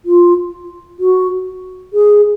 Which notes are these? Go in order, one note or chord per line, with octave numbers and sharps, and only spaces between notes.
F4
F#4
G#4